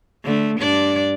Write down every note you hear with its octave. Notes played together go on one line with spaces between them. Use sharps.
D3 A3
G2 D4 D5